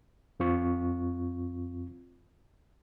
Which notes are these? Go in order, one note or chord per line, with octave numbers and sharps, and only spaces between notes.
F2 C4 F4 C#6